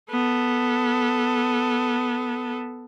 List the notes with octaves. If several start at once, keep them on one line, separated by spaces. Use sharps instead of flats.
B3 A4